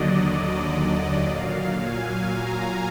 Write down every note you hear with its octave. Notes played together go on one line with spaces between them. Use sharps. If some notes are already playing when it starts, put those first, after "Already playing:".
Already playing: D#2 D3 F#3 D5 D#5
D#5
D#5
A#2 F#3 F5
G#5
A#5